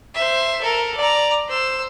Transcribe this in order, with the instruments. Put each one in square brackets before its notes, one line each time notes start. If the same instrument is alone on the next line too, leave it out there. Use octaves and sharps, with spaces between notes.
[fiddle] C5 E5
A4 A#4
D5 A#5
C5 E6